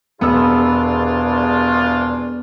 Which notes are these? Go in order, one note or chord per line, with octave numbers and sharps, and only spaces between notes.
E1 C2 B3 D4 F4 G#4 E6